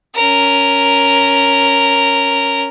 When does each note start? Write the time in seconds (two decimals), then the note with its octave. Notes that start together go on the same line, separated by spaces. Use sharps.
0.15 C#4 A#4